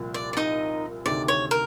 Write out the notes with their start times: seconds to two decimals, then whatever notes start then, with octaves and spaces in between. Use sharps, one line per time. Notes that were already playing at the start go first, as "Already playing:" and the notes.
Already playing: C2 A#2 F3
0.14 D5
0.33 D5
0.37 D#4 D#5
1.05 D2 C3 D#3 D5
1.28 C#5
1.51 A#4